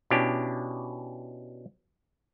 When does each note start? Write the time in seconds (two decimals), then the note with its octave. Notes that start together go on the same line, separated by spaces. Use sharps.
0.11 B2 C#4 D4 E4 G4